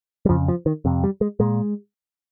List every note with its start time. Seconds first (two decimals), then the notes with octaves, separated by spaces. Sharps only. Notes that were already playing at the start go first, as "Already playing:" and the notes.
0.25 G3
0.29 F2 C#3 F3
0.48 F3
0.66 D#3
0.85 F2 C3
1.04 G3
1.21 G#3
1.40 A#2 G#3